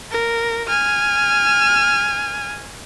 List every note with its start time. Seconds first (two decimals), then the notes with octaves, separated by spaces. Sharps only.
0.11 A#4
0.68 G#5 F6